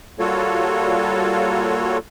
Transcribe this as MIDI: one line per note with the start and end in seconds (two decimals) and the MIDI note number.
0.19 1.98 55
0.19 1.98 58
0.19 1.98 65
0.19 1.98 66
0.19 1.98 69
0.19 1.98 73